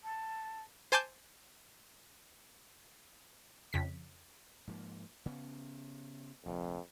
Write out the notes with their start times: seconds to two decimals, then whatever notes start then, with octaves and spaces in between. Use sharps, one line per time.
0.04 A5
0.92 C5 G#5 A5 D6 G6
3.73 F2 C#3 B6
4.67 G#2 F3 A#3
5.26 C#3 B3 C#4
6.46 F1 A#1 F2